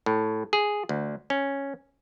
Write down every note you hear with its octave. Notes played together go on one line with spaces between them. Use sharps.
A2
G#4
D2
C#4